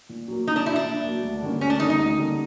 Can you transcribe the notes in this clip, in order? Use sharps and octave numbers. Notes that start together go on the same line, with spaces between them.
A#2
F#3 A#3
A#2 D#4
D4
F#3 A#3 E4
D4
A#2
F#3 A#3
D2
D3 G3 A#3 C#4
D2 C#4
D4
D3 G3 A#3 C#4 D#4
D#4
D2
D3 G3 A#3 C#4